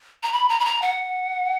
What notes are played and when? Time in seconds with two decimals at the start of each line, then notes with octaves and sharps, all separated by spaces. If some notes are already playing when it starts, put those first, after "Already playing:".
0.23 A#5
0.33 B5
0.49 A#5
0.60 B5
0.65 A#5
0.82 F#5